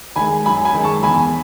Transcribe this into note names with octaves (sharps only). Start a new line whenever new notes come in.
D#3 G#3 G#5 B5
F#2 G#5 B5
G#5 B5
D#3 G#3
A5 C#6
E2 G#5 B5